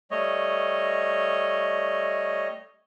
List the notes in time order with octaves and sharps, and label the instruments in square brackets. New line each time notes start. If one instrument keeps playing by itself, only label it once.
[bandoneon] G3 A3 C#5 D#5